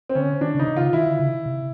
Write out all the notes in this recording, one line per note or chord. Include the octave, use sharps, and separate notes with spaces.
C4
D3 C#4
D#3 D4
C#3
D#4
C3
C#3 F4
D#3 E4
D3
C#3
C3